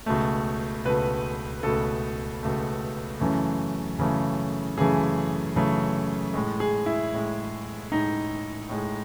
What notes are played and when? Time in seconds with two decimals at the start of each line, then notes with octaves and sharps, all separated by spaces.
0.06 C#2 B2 A3
0.85 C#2 B2 A3 B4
1.63 C#2 B2 A3 A4
2.43 C#2 B2 A3
3.20 F#2 C#3 E3 A3
3.98 F#2 C#3 E3 A3
4.77 F#2 C#3 E3 A3 G#4
5.56 F#2 C#3 E3 A3
6.34 A2 G#3
6.60 G#4
6.86 E4
7.13 A2 G#3
7.92 A2 G#3 D#4
8.69 A2 G#3